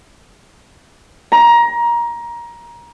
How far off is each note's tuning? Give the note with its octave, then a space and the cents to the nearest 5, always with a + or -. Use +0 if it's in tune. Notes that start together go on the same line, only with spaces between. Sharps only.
A#5 +20